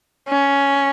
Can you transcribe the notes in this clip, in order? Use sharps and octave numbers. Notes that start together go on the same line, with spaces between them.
C#4